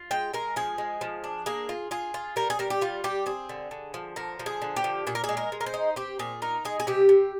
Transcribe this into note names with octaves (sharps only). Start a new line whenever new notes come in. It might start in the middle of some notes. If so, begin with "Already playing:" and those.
Already playing: F4
G#3 G5
G#3 A#4
F3 G#4
G#3
F3
D4
A#3 G#4
F4
F4 G#4
F4
G3 A#4
G#4
G3 A#4
G4
G3 F4
G3 G4
C4 G#4
D3
D3
F3
D3 A#4
F3
G#4
D3
G4
F3
A#2 G#4
A#4
G#4
G#3
A#4
G#3
A#4
C5
D#4
C4 G4
A#2 G#4
D#4 A#4
G#3 G#4
G#4
C3 G4
C3